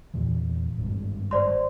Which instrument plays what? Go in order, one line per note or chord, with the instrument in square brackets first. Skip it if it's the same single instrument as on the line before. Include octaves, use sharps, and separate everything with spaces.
[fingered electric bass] E2 A#2 E3
G#1 G2
[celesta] C5 D5 C6